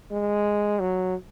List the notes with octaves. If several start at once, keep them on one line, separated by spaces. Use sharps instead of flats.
G#3
F#3